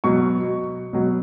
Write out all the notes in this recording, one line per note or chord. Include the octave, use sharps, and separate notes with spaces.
B2 F#3 C#6
B2 F#3